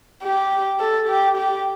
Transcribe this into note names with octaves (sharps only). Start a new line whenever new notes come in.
G4
A4
G4
G4